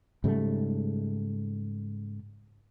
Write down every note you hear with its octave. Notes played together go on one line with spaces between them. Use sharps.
G#2 C#3 G3 A3